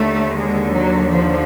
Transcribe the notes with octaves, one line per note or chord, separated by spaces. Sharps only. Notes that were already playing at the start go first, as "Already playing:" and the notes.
Already playing: D#2 D3 A3
G#3
F#3
F3